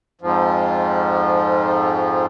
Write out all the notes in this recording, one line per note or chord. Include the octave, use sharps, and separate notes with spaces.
F2 G#2 F3